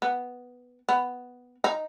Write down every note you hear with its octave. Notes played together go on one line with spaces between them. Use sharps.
B3
B3
D#4